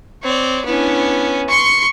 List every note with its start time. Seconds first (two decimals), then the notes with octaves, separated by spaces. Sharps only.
0.23 C4 C#5 D5
0.65 B3 C#4 D4 E4
1.49 C6 C#6 C#7